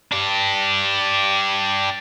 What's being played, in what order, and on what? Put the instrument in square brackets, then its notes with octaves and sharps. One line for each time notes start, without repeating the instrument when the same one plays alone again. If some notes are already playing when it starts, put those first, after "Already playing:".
[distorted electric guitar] D4 G4